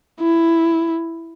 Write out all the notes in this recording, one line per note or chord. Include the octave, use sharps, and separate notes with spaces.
E4